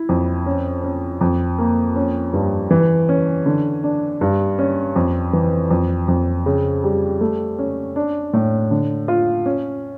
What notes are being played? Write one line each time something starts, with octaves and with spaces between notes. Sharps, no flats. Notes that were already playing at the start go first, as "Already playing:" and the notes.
Already playing: E4
F2
C#4
C#4
F2
A#3
C#4
G2
E3
C#4
D3
D4
G2
C#4
F2
E3
F2
F2
C#3
G3
A3
C#4
D4
A2
D3
F4
C#4